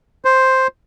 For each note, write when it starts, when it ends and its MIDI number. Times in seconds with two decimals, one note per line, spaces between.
0.25 0.67 72